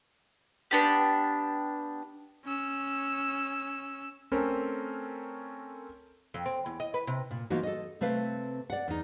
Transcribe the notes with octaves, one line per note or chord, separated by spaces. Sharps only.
B3 D4 G4
C#4 E6
A3 C4 C#4 A4 A#4
F2
C4
E2
D#5
B4
C3
A#2
E3 A#3 B3 D#4 F4 F#4
A4 D#5
C3 A3 C4 B4 F5
D5 F#5
E2 D#4